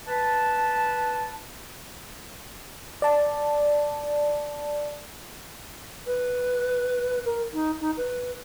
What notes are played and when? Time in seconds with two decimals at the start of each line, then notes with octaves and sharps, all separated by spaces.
0.07 B4 A5
3.02 D5 A5
6.07 B4
7.25 A#4
7.53 D#4
7.80 D#4
7.97 B4